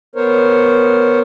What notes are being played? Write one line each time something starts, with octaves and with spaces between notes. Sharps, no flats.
B3 A#4 C5 C#5